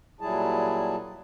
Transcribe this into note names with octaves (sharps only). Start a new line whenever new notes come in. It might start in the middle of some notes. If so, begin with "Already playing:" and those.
A#2 F#3 G3 E4 G#4 A5